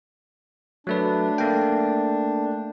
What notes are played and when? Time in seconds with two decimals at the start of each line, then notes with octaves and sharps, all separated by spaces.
0.87 F#3 A3 D4 B4
1.38 A3 A#3 G5